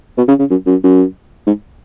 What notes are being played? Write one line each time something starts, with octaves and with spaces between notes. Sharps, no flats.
B2
C#3
C#3
F#2
F#2
F#2
G#2